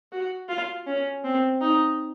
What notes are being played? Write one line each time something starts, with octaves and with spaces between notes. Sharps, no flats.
F#4
F4
C#4
C4
D#4